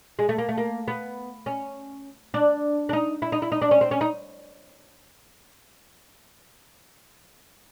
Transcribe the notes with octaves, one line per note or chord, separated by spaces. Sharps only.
G#3
A3
A#3
A3
A#3
B3
C#4
D4
D4
D#4
E4
D#4
E4
D#4
D4
C#4
C4
C#4
D#4